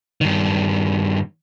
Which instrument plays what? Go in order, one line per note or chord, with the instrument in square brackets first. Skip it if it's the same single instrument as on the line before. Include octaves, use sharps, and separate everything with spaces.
[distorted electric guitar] G2 D#3